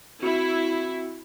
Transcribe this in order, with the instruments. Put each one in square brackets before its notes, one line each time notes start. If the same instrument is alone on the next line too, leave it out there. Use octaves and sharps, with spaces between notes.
[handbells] C4 F#4 C#7 [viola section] E4